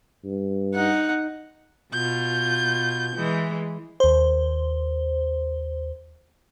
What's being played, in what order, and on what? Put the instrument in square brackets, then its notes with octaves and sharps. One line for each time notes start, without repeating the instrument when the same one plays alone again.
[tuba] G2
[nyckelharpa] D#4 F#5
[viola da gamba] B2 F4 [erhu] G6
[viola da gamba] E3 G#3
[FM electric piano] D#2 C5